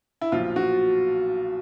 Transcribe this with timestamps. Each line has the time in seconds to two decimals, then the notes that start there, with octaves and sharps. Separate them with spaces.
0.21 E4
0.32 B1 A#2 F3 F4
0.56 F#4